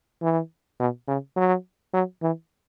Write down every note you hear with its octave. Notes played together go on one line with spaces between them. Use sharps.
E3
B2
C#3
F#3
F#3
E3